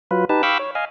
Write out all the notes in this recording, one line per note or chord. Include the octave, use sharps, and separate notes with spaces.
F#3 F4 B4
D#4 G4 B4 A5
F5 G5 B5 C#6 D6 E6
C#5
D#5 F5 G#5